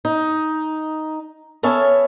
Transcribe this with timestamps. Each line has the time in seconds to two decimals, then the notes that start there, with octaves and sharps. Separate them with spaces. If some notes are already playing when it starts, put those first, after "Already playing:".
0.05 D#4
1.63 B3 C#4 A4 C#5 E5 A5